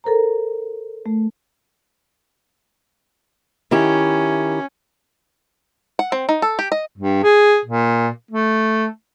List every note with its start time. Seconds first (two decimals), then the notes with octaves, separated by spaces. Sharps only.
0.04 A4 A#4 C5 A#5
1.06 A3
3.71 D#3 C#4 E4 G4
5.99 F#5
6.12 C4
6.29 D#4
6.42 A4
6.59 G4
6.72 D#5
6.98 G2
7.23 G#4
7.65 A#2
8.31 A3